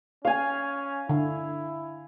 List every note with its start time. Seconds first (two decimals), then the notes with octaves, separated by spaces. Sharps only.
0.25 C#4 F5 G#5
1.09 D3 E4